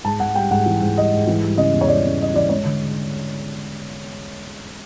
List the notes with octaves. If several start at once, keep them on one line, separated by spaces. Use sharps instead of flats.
G#2 A5
G#2 F#5
G3 G5
G#2 F#5
E3
G#2
G3 D#5
G#2
E3
G3
C#3 D#5
E2
C#5
G3 D5
C#3
G3 D#5
E3 D5
G#3 C#5
D3